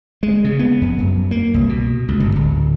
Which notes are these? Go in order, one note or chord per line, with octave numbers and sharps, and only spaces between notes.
G#3
C#3
B3
F2
F#2
A#3
C2
B2
C#2
G1
D1